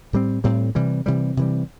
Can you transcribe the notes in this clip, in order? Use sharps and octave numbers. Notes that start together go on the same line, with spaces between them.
A2 G3 C4
A2 G3 C4
C3 E3 G3
C3 E3 G3
C3 E3 G3